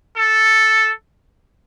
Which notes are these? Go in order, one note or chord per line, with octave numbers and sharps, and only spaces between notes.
A4